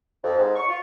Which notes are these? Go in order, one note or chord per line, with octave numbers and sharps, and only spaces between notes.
F2
G#2
C#6
F4